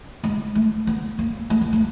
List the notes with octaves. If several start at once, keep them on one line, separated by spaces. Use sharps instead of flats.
G#3
A3
B3
A#3
A3
A#3
A3